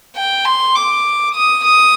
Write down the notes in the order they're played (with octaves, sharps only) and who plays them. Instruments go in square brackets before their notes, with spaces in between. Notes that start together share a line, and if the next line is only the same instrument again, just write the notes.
[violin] G5
C6
D6
D#6
D#6